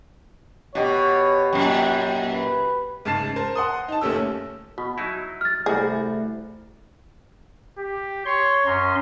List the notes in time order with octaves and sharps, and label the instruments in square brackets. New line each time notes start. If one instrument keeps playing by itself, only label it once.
[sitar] B2 [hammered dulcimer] F#4 G4 D6 [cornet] C#5
[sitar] F#2 A#2 [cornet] G5
[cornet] B4
[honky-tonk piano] G#2 C#3 A5 A6 C7 E7
A#4 C5 A5
F#5 C6 D#6
D#4 A5
F#1 A#2 A3 C#4 G4 E6
[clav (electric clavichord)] B2 [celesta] F#4
[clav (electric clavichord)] F#3 D#4 E4
[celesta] F6 A6
[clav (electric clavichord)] C2 F#4 [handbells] A3 E4 [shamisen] G#4
[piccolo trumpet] G4
[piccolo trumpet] C#5 [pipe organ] C6
[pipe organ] F#2 C#4 C6 [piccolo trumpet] A#5